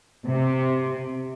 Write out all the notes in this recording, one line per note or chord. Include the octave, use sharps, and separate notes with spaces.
C3